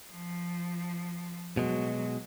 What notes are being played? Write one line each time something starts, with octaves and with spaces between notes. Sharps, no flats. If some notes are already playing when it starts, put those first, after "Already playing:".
F3
B2 F#3 G#3